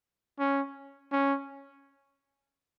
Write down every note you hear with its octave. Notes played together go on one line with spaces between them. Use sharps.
C#4
C#4